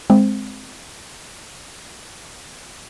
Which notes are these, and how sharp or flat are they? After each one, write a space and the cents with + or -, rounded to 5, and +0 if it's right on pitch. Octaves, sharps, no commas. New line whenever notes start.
G#3 +5 C4 +0